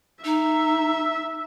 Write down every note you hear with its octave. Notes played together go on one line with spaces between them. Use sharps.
D#4 E5